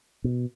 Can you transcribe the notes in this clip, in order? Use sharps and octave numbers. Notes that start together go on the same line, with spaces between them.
B2